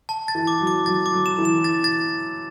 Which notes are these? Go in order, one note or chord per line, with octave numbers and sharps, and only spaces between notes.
A5
A6
E3
D6
F#3
D6
F#3 A6
D6
F#3
E7
E3
E7
A6
A6